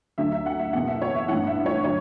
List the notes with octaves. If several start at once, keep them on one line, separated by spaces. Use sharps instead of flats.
D2 D3 F#3 E5
E5
F#5
E5
F#1 E2 B2 F#5
E5
C#5
E5
A1 G2 E3 F#5
E5
C#5
D3 F#3 C#5